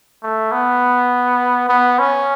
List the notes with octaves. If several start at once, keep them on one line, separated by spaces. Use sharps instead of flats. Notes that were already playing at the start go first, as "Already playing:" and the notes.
A3
B3
B3
C#4